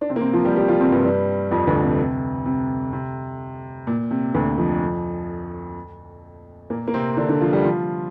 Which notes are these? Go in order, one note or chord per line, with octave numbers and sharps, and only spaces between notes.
D4
C3 C4
A#3
C3 C4
F3 F4
G3 G4
G3 G4
F3 F4
C3 C4
G2 G3
G2 G3
F2 F3
D2 D3
C3
C3
C3
C3
A#2
C3
D2 D3
F2 F3
A#2 A#3
A#3
C3 C4
D3 D4
D3 D4
F3 F4
G3 G4
F3 F4